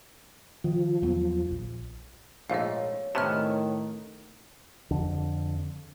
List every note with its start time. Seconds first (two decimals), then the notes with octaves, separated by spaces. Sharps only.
0.64 D#3 F3
1.02 E2 F#3 B3
1.51 A#1
2.50 A#1 G#2 A3 C#5 D#5 F5
3.15 A2 C3 D#3 B3 C#4 A5 F6
4.91 F2 D3